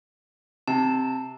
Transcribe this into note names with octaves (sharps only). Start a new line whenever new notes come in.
C3 A5